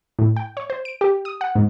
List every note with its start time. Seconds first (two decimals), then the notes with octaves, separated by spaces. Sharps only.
0.19 A2
0.36 G5
0.57 C#5
0.70 C5
0.85 D7
1.01 G4
1.25 D#6
1.41 F#5
1.55 G#2